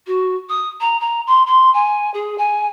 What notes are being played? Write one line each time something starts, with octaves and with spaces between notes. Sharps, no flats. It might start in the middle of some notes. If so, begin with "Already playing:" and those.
F#4
D#6
A#5
A#5
C6
C6
G#5
G#4
G#5